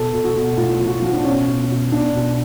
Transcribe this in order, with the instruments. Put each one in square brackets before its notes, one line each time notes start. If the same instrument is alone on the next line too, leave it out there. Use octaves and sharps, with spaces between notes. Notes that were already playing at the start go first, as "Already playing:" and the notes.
Already playing: [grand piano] B2 A4
B2
F#4
B2
A2 F4
F3
F#4
F3 F4
D4
B2 C#4
B2
B2
B2 D4
B2